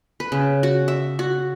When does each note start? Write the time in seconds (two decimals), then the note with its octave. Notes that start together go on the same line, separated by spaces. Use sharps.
0.20 B4
0.32 C#3
0.63 F#4
0.88 E5
1.19 F#4